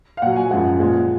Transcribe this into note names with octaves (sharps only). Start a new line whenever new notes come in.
F5
A#2 F#3 F#5
G#5
F#2 F3 G#3 F#5
A#2 F3 G#3